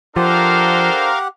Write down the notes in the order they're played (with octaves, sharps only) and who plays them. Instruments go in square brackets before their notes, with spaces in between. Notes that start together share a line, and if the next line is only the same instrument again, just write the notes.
[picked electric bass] F3 [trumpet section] D4 A4 C5 [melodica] G4 F#5 [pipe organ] A#4 F5